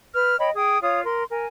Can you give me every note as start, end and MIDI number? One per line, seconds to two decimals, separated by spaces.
0.13 0.36 71
0.13 0.36 89
0.39 0.50 73
0.39 0.50 75
0.39 0.50 79
0.39 0.50 83
0.56 0.81 68
0.56 0.81 79
0.56 0.81 87
0.82 1.00 65
0.82 1.00 73
0.82 1.00 77
0.82 1.00 87
1.04 1.24 70
1.04 1.24 84
1.30 1.47 70
1.30 1.47 80